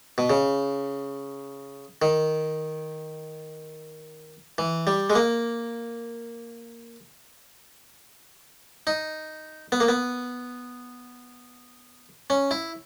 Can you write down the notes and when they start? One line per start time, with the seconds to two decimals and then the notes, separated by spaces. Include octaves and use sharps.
0.18 B2
0.30 C#3
2.02 D#3
4.58 E3
4.87 G3
5.10 G#3
5.15 A#3
8.87 D#4
9.72 B3
9.80 A#3
9.88 B3
12.30 C#4
12.51 E4